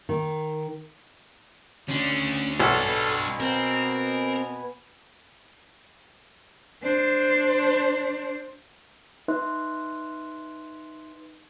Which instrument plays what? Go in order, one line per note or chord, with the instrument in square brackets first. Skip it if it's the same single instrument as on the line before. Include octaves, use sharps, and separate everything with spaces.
[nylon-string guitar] D#3
[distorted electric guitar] D2 D4 [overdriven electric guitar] C#4
[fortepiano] B1 [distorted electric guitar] D4 B4 [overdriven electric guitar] A4
[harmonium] B2 B3 G#5
[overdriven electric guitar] C4 [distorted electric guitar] A#4
[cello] D4 C5
[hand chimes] D#4 B4 E5 C6 F#6